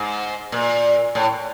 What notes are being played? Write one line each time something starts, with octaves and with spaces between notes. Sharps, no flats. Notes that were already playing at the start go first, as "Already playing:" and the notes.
Already playing: G#2
A#2
A2